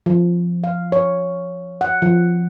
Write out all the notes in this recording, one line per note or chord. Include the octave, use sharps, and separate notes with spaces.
F3
F5
C#5
F#5
F3